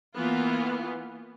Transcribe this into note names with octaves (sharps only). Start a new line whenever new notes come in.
E3 A#3 B3 F4